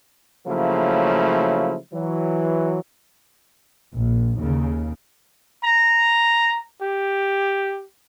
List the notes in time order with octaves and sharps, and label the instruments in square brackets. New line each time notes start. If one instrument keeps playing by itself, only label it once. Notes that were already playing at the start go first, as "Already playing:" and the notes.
[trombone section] C#3 F3 F#3 A3 A#3 E4
E3 F#3
[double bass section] A#1
D#2 C#3
[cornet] A#5
G4